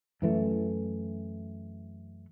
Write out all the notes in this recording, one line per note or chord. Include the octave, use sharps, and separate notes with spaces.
F#2 E3 A3